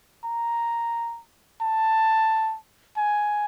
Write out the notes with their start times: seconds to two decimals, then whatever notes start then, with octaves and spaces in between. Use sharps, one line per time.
0.24 A#5
1.61 A5
2.98 G#5